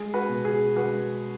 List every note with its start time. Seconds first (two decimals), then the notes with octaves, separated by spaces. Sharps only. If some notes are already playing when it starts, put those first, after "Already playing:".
Already playing: G#3 G#4
0.14 F#4 B4
0.29 B2
0.45 G#4
0.76 G#3 F#4 B4